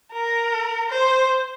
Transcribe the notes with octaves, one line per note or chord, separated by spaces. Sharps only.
A#4
C5